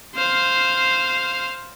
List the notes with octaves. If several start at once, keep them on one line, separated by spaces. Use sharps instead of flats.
C5 F5